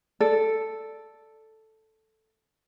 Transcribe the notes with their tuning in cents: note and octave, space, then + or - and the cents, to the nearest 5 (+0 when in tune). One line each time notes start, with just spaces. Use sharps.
A4 +0 D5 +0